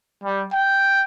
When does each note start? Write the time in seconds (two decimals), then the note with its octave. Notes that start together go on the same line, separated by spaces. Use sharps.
0.24 G3
0.53 G5